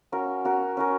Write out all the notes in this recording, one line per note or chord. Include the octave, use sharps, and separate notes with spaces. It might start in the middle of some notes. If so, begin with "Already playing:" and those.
C#4 F#4 A#4
C#4 F#4 A#4
C#4 F#4 A#4